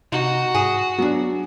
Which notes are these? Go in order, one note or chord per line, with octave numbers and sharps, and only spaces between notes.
C3 D#4 F#4
G#2 G#4
F#3 B3 D4